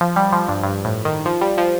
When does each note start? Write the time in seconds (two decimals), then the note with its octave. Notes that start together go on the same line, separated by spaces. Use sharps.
0.01 F3
0.16 G3
0.32 F3
0.48 G2
0.63 G2
0.85 A2
1.05 D#3
1.26 F3
1.41 G3
1.58 F3